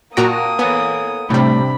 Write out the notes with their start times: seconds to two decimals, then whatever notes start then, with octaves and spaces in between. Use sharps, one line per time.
0.17 A#2 A#3 F#4 G5 A5 A#5 D#6
0.59 B3 A4 C#5 G#5
1.30 A2 C3 G3 A3 D4 B5